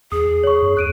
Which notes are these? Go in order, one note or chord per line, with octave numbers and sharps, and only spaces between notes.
E2 G#4 D#6
C#5 C#6
F#2
E2 F#6 D7 D#7